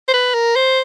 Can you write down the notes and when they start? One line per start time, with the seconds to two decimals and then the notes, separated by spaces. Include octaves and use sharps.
0.08 C5
0.14 B4
0.34 A#4
0.56 C5